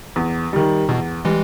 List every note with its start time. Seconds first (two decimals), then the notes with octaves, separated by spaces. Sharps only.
0.16 E2
0.53 D#3 G3
0.89 E2 B2
1.25 E3 G3 G#3